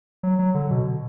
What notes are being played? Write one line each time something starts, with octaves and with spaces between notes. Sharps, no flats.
F#3
F#3
D3
B2